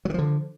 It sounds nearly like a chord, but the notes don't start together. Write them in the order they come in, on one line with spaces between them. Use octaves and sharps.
F#3 D#3 F3 D3